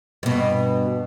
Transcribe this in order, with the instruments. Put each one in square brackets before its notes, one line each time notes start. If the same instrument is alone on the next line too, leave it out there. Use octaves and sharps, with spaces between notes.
[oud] G2 B2